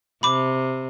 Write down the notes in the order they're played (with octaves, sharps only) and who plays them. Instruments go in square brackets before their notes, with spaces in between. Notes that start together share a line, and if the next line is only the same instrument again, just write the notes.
[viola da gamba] C3 [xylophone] B5 D6